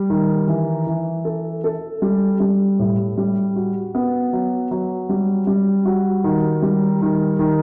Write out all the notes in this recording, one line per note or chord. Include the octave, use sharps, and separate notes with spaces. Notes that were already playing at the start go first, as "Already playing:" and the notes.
Already playing: G3
D#3
E3
E3
A4
A4
G3
G3
A2
G3
F#4
B3
F#3
F#3
G3
G3
F#4
D#3
G3
D#3
D#3